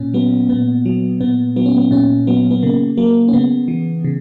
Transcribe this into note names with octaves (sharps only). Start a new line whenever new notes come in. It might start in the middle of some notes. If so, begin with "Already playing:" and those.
Already playing: A#2 C#4
F#3 B3
A#2 B3
F#3
A#2 B3
F#3 B3
C#4
B3
A#2 C#4
F#3 B3
B3
C#3 A#3
F#3 A#3
C#4
C#3 B3
E3
C#3